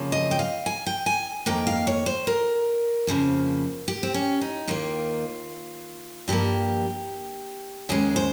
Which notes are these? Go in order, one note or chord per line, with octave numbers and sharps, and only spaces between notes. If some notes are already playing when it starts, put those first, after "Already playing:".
Already playing: F2 C#3 F3 A#3
D#5
G5
F5
G#5
G5
G#5
F2 D#3 A#3 G5
F5
C#5
C5
A#4
F2 C#3 F3 A#3
G4
C4
C#4
D#4
D#2 D#3 A#3 F4
G2 F3 A#3 G4
D#2 C#3 G#3 G#4
C5